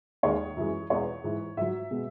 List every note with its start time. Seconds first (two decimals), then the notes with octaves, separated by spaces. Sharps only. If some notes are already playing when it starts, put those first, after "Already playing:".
0.23 D#2 D#3 G#3 C#5
0.57 F#2 E3 G#3
0.90 E2 B2 G#3 C#5
1.24 G#2 E3 G#3
1.57 G#2 F#3 E5
1.91 B2 G#3